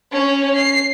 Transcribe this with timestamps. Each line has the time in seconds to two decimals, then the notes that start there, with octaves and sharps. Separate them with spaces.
0.13 C#4 C#5
0.55 C7